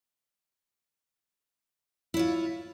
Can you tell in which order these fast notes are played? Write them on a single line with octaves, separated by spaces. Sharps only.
E4 C#5 F4